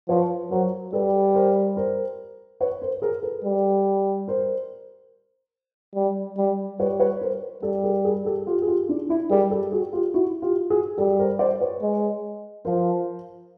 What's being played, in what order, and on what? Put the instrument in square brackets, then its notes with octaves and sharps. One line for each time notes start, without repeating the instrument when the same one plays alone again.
[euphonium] F3 [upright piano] B4 C#5
[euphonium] F#3 [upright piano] A#4 C5
[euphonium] G3 [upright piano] A4 B4
[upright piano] A#4 C5
A#4 C5
B4 C#5
A#4 C5
G#4 A#4
A4 B4
[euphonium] G3
[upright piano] A#4 C5
[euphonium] G3
G3
[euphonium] G3 [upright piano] B4 C#5
[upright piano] B4 C#5
A#4 C5
[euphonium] G3 [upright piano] G4 A4
[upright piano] G#4 A#4
G#4 A#4
G4 A4
F4 G4
G#4
F4 G4
D4 E4
D4 E4
[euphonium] G3 [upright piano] G#4 A#4
[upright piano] G4 A4
F#4 G#4
F4 G4
E4 F#4
F4 G4
F#4 G#4
[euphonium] G3 [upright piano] G4 A4
[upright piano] A#4 C5
C5 D5
B4 C#5
[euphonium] G#3
[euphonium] F3 [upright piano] A#4 C5